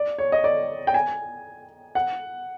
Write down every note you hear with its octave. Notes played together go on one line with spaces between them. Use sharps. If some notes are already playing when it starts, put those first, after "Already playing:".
Already playing: D5
C#5
D#5
D5
G5
G#5
F#5